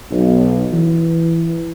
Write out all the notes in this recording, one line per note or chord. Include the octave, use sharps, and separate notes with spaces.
B1
E3